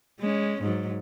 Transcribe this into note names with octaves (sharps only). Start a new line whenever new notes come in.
G#3 C#4
G#2 F#3